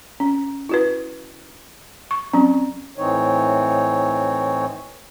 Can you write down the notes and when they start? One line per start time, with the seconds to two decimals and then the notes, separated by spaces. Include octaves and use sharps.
0.20 C#4
0.69 E4 F#4 B4
2.11 C#6
2.33 F#3 C4 C#4
2.98 A2 E3 C4 D#4 C#5